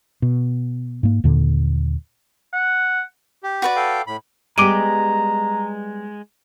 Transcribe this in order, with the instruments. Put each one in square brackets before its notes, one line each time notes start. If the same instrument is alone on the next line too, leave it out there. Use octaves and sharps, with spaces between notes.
[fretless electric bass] B2
G#2 A#3
D#2 A#2 D3
[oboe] F#5
[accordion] G4
[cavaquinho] F#4 B4 D5
[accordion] A4 F5 G5
A2 B5
[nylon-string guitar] G3 B3 G4 [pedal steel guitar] G#3 [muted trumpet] A#5 [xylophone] D6 D7 D#7